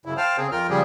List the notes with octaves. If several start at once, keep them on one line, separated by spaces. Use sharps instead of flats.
F#2 C#3 E4
C5 F5 G5 A5 F6
C#3 C4 G#4
F2 F4 A#4 G5 F6
C#3 F3 G3 G4 G#4